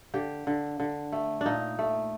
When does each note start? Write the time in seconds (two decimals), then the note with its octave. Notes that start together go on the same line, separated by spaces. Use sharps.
0.14 D3 G4
0.47 D3
0.80 D3
1.12 A3
1.41 A#2 D4 D#4
1.79 A3